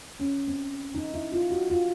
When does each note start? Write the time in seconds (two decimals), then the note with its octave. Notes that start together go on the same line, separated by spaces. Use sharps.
0.20 C#4
0.48 C4
0.95 D#4
1.14 E4
1.32 F4
1.51 F#4
1.70 F4